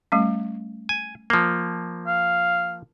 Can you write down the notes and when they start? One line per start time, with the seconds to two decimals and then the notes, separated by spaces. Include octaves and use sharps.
0.12 G3 A3 C#4
0.89 G#5
1.30 F3 A#3
2.07 F5